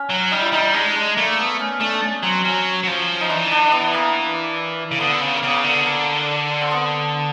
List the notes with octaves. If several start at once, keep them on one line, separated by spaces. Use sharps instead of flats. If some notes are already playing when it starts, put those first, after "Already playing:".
Already playing: C#4
F#3
G3 D#4
E4
G3 D#4
G#3 D4
D4
A3 A#3
B3
C#4
A3 D4
C#4
F#3 C4
F#3 C#4
F#3
F3
D#4
E3 D4
D4
B3
A#3
C#3
D3 B3
C#3
A#3
C#3 B3
D3
A#3
C4
B3